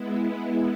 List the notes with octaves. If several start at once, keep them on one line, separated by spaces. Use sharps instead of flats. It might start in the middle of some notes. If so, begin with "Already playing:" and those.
Already playing: G#3 B3 E4